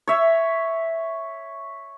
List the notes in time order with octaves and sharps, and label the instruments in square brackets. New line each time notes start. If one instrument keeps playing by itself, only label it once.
[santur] C#5 E5